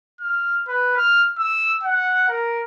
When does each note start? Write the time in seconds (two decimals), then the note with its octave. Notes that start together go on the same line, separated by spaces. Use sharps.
0.21 F6
0.68 B4
0.96 F6
1.38 E6
1.83 F#5
2.29 A#4